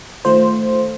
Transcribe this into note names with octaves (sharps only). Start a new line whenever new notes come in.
D#3 A3 F4 C5